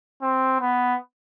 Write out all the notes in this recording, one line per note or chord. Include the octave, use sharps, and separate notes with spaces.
C4
B3